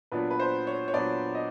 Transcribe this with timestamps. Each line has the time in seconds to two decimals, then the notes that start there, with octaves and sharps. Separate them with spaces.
0.12 A#2 F#3 B3 D4 B4
0.31 B4
0.39 C5
0.67 C#5
0.88 C#5
0.93 A#2 F#3 B3 D4 D5
1.35 D#5